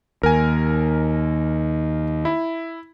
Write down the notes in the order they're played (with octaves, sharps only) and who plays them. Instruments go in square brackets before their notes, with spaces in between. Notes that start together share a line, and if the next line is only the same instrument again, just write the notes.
[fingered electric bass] D#2 [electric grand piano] A#4 G#5
[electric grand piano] E4